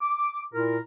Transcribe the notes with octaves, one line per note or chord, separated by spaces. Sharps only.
D6
A#2 E4 F4 A#4